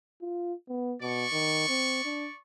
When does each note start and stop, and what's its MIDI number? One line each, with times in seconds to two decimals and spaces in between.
0.22 0.53 65
0.69 0.95 59
1.02 1.25 47
1.02 2.37 74
1.02 2.37 85
1.33 1.63 51
1.68 2.01 60
2.05 2.28 62